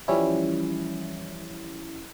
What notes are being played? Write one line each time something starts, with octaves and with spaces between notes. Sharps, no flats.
E3 F3 G3 C#4 E4